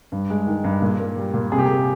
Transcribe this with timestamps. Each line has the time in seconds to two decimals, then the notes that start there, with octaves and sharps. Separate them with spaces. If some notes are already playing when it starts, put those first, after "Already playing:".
0.12 G2
0.30 G#3
0.47 D#3
0.64 G2
0.82 A#2
1.00 A#3
1.17 G3
1.34 A#2
1.52 C3 G#4
1.59 G4
1.66 A#3 G#4